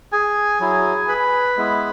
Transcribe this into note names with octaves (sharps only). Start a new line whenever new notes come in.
G#4 G#5
F#3 E4
B4 B5
G#3 B3 E4